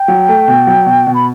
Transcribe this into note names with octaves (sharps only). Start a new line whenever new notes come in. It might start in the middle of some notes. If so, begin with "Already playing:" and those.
Already playing: G5
F#3
A3
B2
F#3
B2
B2
B5